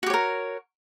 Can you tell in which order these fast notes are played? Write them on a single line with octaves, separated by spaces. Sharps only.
F#4 G4 C#5 A#4